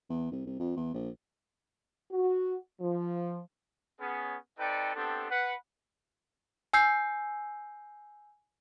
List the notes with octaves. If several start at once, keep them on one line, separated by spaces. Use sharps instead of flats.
E2
C2
C2
F2
E2
A#1
F#4
F3
B3 C#4 G#4
C4 D#4 A4 B4 D5 G5
B3 C4 D4 G4 A4
B4 F#5
G#5 E6 G6 C7